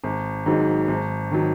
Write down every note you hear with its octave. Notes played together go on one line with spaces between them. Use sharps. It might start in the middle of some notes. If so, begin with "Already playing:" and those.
G#1
G#2 D#3 F#3
G#1
D#3 F#3